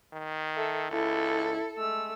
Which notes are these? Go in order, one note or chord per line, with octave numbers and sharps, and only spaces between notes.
D#3
A4 E5
C#2 E4 A4
G#3 A3 E6